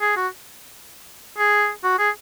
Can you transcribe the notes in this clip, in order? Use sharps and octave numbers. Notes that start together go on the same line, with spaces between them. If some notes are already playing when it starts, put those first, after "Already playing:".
G#4
F#4
G#4
F#4
G#4